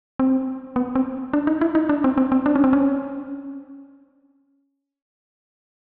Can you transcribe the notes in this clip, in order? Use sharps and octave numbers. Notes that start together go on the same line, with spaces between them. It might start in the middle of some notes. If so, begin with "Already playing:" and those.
C4
B3
C4
D4
D#4
E4
D#4
D4
C4
C4
C4
D4
C#4
C4
C#4